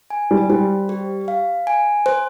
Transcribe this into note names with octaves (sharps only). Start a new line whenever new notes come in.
G#5
G3
G3 C5
G4
F5
G#5
C5